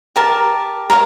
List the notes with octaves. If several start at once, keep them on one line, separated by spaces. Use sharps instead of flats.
G4 A#4 A5
A#4 C#5 E5 F5